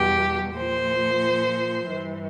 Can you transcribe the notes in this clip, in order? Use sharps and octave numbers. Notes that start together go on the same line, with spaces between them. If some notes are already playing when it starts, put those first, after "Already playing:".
Already playing: E2 B2 G3 G4
A#2 F3 C5
G2 E3 G3